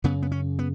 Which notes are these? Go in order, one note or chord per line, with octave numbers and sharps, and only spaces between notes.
F#2 C#3 B3
B3
C#4
B3